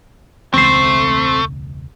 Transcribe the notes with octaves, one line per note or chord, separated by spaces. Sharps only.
E1 C#2 A3 C4 C5